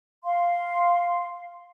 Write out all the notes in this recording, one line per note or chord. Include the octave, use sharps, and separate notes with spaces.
F5 C6